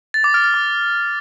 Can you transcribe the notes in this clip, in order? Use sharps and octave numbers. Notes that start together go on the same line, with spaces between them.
A6
D6
F6
F6
D6